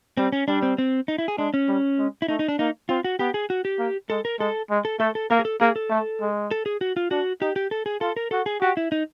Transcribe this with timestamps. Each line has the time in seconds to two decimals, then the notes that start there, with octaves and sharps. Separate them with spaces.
0.17 G3 C4
0.32 C#4
0.48 G3 D4
0.63 C4
0.78 C4
1.08 D#4
1.18 E4
1.28 G#4
1.38 G#3 D4
1.54 C#4
1.69 G3
1.98 G#3
2.22 E4
2.28 A3 D#4
2.39 D#4
2.48 D4
2.59 A#3 D#4
2.89 C4 F4
3.04 F#4
3.19 B3 G4
3.34 G#4
3.50 F#4
3.65 G4
3.79 A#3
4.10 G#3 A4
4.25 A#4
4.39 G#3 A4
4.70 G#3
4.85 A4
5.00 A3 A4
5.15 A4
5.31 A#3 A#4
5.39 G#4
5.45 A4
5.61 A#3 G#4
5.76 A4
5.90 A3
6.21 G#3
6.51 A4
6.66 G#4
6.81 F#4
6.97 F4
7.11 D4 F#4
7.41 D#4 G4
7.56 G4
7.71 A4
7.86 G#4
8.01 F4 A4
8.17 A#4
8.31 F#4 A4
8.46 G#4
8.61 F#4 G4
8.77 E4
8.92 D#4